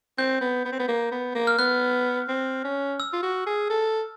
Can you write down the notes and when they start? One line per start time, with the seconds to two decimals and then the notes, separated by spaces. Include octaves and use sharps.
0.18 C4 G6
0.41 B3
0.65 B3
0.72 C4
0.79 B3
0.88 A#3
1.12 B3
1.35 A#3
1.47 F6
1.58 B3 F#6
2.28 C4
2.64 C#4
3.00 E6
3.13 F4
3.23 F#4
3.46 G#4
3.70 A4